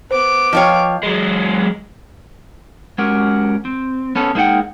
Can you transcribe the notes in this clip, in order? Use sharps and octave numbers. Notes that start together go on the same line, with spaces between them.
B3 C5 D6
F3 F4 C#5 D#5 G5
F#3 G#3
G#3 C#4 F#4 G4 A#4
C4
B3 C#4 A4
G#3 A#3 D#4 E4 F#5 G5